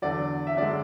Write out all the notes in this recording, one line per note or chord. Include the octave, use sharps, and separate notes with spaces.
E2 D3 F#3 D5
E5
F#2 D3 G#3 D5